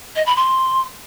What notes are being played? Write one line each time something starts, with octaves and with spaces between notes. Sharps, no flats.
D#5
B5
C6